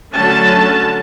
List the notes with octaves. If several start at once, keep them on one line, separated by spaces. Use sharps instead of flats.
D3 F#3 A3 C#4 A5